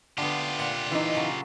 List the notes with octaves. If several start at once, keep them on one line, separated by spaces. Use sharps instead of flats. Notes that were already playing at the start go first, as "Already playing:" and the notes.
D3 B3 F4 G4
A#2 F#5
E3 D#4
C#3 F#3